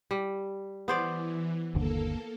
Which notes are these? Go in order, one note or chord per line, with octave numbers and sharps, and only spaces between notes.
G3
E3 B3 C5 D5
G1 D#2 D3 A#3 A4